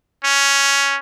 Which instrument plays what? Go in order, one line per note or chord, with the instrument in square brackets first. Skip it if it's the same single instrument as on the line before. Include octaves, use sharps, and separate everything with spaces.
[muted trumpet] C#4